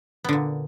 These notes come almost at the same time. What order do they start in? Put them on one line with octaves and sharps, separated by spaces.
B3 D3 A#2